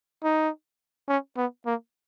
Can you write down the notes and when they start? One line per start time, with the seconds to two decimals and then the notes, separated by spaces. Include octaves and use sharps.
0.24 D#4
1.09 C#4
1.37 B3
1.66 A#3